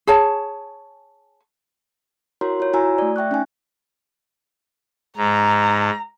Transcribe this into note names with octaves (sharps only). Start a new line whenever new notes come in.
G#4 C#5 A5
E4 F#4 A#4 C#5 A#5 C6
F4 C#5
E4 F#4 G#5 A#5 E6
A3 D5
E5 G5 C#6 F#6
C#4 D#4 G#5
G#2 A#5